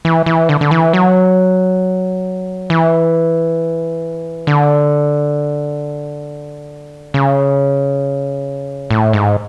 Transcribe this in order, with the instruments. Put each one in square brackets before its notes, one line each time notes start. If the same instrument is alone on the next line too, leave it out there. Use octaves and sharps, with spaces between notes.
[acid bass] E3
E3
D3
D3
E3
F#3
E3
D3
C#3
A2
G#2